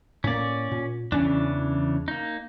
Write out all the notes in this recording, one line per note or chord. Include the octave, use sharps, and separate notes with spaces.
A2 A#3 C#4 D5
A#2
E2 C#3 E3 C#4 D4
A#3 D#4